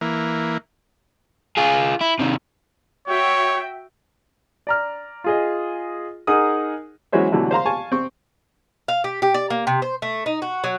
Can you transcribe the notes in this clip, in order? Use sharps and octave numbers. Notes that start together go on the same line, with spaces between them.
E3 A#3
F4 G#4
E4
C3 D#3
F#4 C#5 E5 G5
D5 A#5 F6
F4 G#4 D#5
D#4 G#4 A#4 F#5 D#6
E3 F#3 G#3 C#4 C5 E5
B2 D3 E3 F#3 G3 A3
C5 F5 A#5 C6
F5 G#5 A5 C#6
C4 C#6
F5
G4
G4
D5
A#3
C3
C5
A3
D#4
F#4
F#3